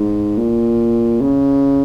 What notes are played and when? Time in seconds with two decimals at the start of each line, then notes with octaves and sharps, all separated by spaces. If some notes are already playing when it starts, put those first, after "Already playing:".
Already playing: G#2
0.38 A#2
1.21 C#3